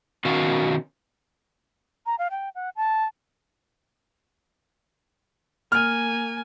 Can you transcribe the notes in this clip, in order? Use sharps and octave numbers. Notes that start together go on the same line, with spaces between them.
B2 D#3 C#4 F#4 F5
A#5
F5
G5
F#5
A5
A#3 G#5 F6